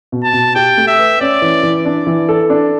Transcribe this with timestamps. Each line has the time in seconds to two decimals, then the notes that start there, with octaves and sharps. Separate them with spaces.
0.12 B2
0.24 A5
0.33 B2
0.55 G4 G5
0.77 A3
0.88 E5
0.99 B4
1.21 C#4 D5
1.42 E3
1.63 E3
1.85 D4 D5
2.07 E3
2.29 A4
2.50 D4